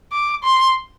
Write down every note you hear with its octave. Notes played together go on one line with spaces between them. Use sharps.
D6
C6